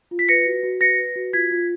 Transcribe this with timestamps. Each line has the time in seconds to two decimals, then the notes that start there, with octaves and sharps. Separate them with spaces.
0.11 F4
0.19 B6
0.29 B4 A#6 C#7
0.46 F#4
0.63 F#4
0.80 B4 A#6 C#7
0.98 B4
1.16 F#4
1.33 F4 G#6 B6
1.51 F4